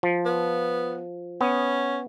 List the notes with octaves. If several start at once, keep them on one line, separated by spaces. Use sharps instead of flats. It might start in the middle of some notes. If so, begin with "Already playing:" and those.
F3
B3
B3 C#4